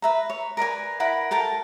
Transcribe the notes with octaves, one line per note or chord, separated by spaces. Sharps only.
B4 E5 A#5
C#5
A#4 B4 D5 G#5
E4 A#4 F#5 B5
A4 A#4 G5 A5